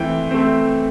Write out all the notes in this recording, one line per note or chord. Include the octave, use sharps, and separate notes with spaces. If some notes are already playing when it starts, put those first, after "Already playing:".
Already playing: E3 A3 C4 G5
A3 C4